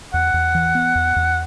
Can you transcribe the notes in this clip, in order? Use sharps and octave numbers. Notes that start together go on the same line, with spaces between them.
E2 F#5
E2
E3
B3
E2
E2